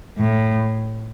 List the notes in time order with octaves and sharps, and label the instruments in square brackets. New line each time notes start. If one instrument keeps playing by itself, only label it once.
[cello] A2